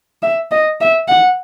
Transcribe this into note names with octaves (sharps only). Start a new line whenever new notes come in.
E5
D#5
E5
F#5